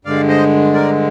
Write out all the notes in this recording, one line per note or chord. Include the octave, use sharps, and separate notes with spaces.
G2 D3 G#3 D5 F5
C5 D#5
A#4 D5